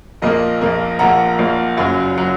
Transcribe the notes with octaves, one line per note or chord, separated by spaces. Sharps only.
A#1 A#2 A#3 A#4 D#5
A#1 A#2 A#3
A#1 A#2 A#3 F#5 A#5
A#1 A#2 A#3
F#1 F#2 F#3
F#3